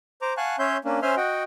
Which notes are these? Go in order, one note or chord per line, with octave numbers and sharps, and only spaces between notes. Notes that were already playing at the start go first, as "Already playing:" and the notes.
C5 A#5 D6
F5 F#5 G#5 A5 C#6 F#6
C#4 C#5 E5 C6 G6
A#3 C#4 D4
C#4 C5 E5 G#5 C6 F6
F#4 D#5 F#5 G5